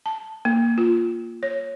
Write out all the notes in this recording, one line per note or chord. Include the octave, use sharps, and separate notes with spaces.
A5
A#3
F4
C#5